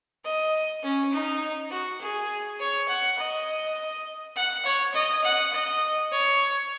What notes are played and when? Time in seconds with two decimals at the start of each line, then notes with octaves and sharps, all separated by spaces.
0.25 D#5
0.83 C#4
1.12 D#4
1.71 F#4
2.01 G#4
2.60 C#5
2.88 F#5
3.18 D#5
4.36 F#5
4.65 C#5
4.94 D#5
5.24 F#5
5.53 D#5
6.11 C#5